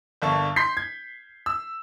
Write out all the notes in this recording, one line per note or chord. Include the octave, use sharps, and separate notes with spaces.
G1 D3 A#3 A5 C#6
C6 G6 B6 C7
G#6
E6